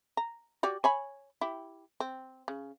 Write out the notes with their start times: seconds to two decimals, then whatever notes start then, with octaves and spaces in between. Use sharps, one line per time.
0.17 A#5
0.63 F#4 G4 D5
0.84 C#5 G#5 B5
1.41 E4 G4
2.00 C4
2.48 C#3